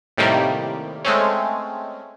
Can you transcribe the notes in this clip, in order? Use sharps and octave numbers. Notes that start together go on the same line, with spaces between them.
A2 C3 D#3 G3 A#3
G#3 A3 C4 C#4